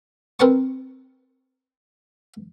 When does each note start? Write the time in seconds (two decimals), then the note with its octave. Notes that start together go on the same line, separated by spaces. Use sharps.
0.40 C4 A#4 B4 A5 C#6